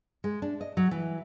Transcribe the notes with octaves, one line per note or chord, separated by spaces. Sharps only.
G#3
D4
D#5
F#3
E3